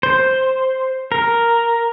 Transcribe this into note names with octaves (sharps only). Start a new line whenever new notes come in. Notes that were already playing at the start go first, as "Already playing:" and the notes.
C5
A#4